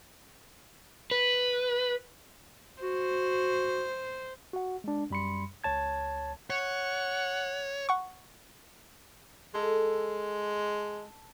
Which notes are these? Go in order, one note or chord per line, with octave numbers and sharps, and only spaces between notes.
B4
F#4 C5
F#4 F#5
G#3 D4
F#2 G3 B5 C6 C#7
C#2 C#5 A5 G#6
C#5 F#5
F#5 C#6
G#3 A4